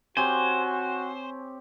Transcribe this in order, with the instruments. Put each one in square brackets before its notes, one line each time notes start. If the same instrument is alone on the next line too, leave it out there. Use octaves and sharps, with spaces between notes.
[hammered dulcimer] C4 G4 C#5 [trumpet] F#4 [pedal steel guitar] C5 [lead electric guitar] G#5